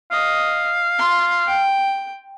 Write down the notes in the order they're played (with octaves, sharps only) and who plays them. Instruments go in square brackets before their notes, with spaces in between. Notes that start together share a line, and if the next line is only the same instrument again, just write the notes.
[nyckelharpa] D#5 [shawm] F5
[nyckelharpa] C6
G5